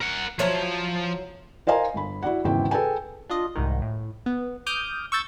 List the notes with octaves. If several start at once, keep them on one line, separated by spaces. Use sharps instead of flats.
A#4 F#5
F3 F#3 E4 C#5
A#4 C5 D#5 F5 G#5 A#5
G1 B5
E4 F#4 D5 F#5
G#1 E2 C#3 E4 G5
G#4 A4 B4 G5 G#5
D4 F4 D#5
C2 G#2 D#3
A2
B3
D6 D#6 F6 G6
C#6 E6 G6 A6